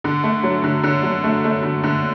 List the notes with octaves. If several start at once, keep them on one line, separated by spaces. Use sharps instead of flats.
D3
A3
F#3
D3
D3
F#3
A3
A3
D3
D3